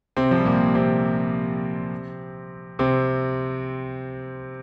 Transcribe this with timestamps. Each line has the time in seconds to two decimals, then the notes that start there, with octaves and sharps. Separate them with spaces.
0.17 C3 C4
0.31 F3
0.38 G3
0.45 A#2 A#3
0.75 C3 C4
2.79 C3 C4